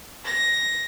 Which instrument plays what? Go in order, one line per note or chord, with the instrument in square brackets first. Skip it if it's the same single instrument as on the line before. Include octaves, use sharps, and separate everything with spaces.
[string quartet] A#6